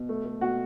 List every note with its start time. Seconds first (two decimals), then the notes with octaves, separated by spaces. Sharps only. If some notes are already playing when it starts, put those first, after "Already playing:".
Already playing: B2
0.09 A3
0.25 A3
0.41 B2 F#4